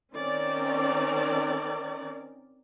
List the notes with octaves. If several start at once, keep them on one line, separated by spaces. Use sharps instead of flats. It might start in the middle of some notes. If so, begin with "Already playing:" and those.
D#3 C4 C#4 A#4 D5